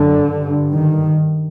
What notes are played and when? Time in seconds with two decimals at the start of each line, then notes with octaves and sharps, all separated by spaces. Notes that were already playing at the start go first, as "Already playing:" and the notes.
Already playing: F#2 D3
0.28 G2
0.74 D#3